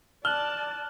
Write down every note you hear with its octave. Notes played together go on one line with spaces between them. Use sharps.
D5 A5 F6 F#6 F#7 G7